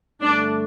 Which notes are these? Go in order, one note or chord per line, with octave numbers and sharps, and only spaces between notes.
G2 D3 A3 D4